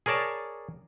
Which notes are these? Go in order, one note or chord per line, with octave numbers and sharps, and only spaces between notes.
G#4 A#4 C#5 D5 A5